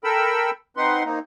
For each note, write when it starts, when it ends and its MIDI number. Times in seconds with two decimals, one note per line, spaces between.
0.04 0.51 69
0.04 0.51 70
0.04 0.51 79
0.04 0.51 83
0.04 0.51 88
0.77 1.03 60
0.77 1.03 63
0.77 1.03 71
0.77 1.03 78
0.77 1.03 84
1.05 1.19 58
1.05 1.19 60
1.05 1.19 63